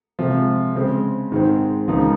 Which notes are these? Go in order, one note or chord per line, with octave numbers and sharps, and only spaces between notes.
C3 F3 G#3
C#3 G#3 C4
G#2 D#3 G#3 C4
C#2 C#3 F3 A#3 D#4